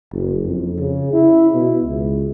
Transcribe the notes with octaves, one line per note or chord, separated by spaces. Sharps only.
F#1
F2
C#3
E4
B2
C#2